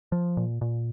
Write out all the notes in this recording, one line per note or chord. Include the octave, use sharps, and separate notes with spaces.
F3
A#2
A#2